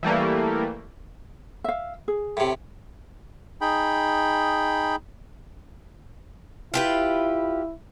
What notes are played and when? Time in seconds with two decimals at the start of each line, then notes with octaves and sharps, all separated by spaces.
0.03 E3 G3 A3 A#3
1.64 E5 F5
2.08 G#4
2.37 A2 C3
3.61 D#4 G#4 G5 B5
6.74 E4 F4 G4 B4